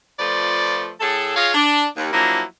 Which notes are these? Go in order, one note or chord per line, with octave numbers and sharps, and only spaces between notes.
F3 A3 F4 B4 D5
A2 G#4 A4
F4 G#4 C#5 D#5 F5
D4
D#2
F3 F#3 A#3 D4 E4